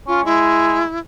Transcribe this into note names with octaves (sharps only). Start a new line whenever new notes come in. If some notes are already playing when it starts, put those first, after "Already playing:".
C#4 F4
G#3 E4